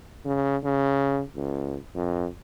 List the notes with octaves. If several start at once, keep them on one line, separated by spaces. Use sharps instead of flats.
C#3
C#3
C#2
F2